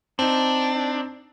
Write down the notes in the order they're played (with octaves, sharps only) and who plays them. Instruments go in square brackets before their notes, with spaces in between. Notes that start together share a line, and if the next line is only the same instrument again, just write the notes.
[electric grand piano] C4 D#4 [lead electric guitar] D4